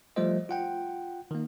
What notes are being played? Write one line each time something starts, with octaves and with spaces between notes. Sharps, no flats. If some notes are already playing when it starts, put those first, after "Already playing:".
F3 G3 A3 F4 C5 D#5
F4 F#5 G5
D#3 A#3